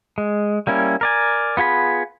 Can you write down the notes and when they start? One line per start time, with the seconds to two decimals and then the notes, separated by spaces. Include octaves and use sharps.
0.18 G#3
0.67 G3 A#3 C#4 E4
1.01 A#4 D5 G#5
1.57 B3 F4 G#4 B5